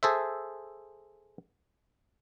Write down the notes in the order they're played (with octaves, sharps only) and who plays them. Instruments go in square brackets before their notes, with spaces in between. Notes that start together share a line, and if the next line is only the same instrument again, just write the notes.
[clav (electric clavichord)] G#4 A4 C5 E5